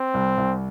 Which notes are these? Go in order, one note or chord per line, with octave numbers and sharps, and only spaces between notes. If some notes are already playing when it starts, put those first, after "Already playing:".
Already playing: C4
C2
C2